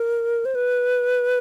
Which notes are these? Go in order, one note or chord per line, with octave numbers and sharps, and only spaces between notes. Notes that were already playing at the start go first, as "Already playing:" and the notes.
Already playing: A#4
C5
B4